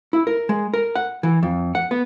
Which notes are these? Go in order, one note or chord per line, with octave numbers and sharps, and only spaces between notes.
E4
A#4
G#3
A#4
F#5
E3
F2
F#5
B3